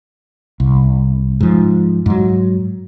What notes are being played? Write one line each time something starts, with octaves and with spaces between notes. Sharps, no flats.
C2
G#2 F3
G#2 F#3